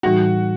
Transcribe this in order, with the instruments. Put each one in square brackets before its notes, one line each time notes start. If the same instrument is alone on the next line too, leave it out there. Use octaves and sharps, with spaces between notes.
[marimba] A2 E3 G3 D#4 [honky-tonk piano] F#4